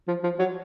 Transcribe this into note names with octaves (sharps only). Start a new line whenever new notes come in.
F3
F3
F#3